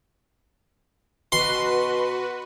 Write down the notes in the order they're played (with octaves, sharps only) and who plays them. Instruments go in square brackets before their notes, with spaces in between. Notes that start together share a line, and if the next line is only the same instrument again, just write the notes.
[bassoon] B2 [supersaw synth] F#4 B4 [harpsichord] C6